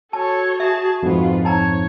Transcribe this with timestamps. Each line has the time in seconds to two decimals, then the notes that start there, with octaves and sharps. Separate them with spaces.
0.13 F#4 A4 C#5 A5
0.60 G#4 E5 A5
1.03 F2 G#2 B3 F4
1.45 D#4 C#5 A5 A#5